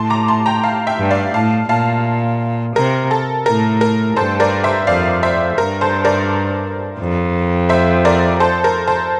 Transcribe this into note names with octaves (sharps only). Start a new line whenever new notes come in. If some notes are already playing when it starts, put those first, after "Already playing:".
Already playing: A2 A5 C6
A#5 D6
A5 C6
G5 A#5
F5 A5
E5 G5
G2
D5 F5
A2 F5 A5
A#2 F5 A5
C3 A#4
A4
A2 A#4
A#4
G2 A4 C5
A#4 D5
C5 E5
F2 D5 F5
C5 E5
G2 A#4
A4 C5
A#4 D5
F2
C5 E5
A#4 D5
A4 C5
A#4
A4 C5